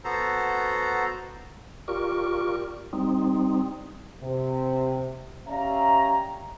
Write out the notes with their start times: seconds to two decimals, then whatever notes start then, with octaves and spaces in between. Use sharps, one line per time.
0.05 B3 F#4 A4 C5 A#5
1.88 F4 G4 A#4 D5 C#6
2.93 G3 C4 D#4
4.21 C3
5.48 C#4 G4 D5 E5 F5 A#5